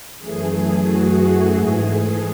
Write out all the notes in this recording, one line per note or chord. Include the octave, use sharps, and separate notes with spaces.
F#2 E3 A3 G#4
F#4
G#2 E3 A3 G#4